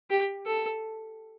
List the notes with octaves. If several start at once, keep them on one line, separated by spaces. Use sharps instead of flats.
G4
A4